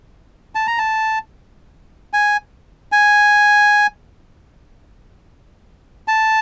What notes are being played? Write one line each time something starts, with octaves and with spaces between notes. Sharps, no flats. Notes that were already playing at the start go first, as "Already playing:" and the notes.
A5
A#5
A5
G#5
G#5
A5